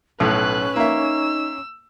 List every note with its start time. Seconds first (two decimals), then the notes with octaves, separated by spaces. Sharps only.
0.20 B1 A2 C#4 B4 F#6
0.76 A#3 D#4 E5 E6